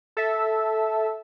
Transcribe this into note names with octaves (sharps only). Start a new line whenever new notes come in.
A4 E5